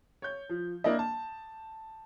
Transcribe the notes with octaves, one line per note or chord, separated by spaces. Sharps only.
C#5 G6
F3
A#3 D4 E4 D#5
A5